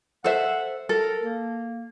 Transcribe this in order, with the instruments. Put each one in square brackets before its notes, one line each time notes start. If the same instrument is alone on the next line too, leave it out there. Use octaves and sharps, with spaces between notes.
[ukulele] A4 C5 E5 [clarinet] F#5
[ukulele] A4 [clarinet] A#4
[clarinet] A#3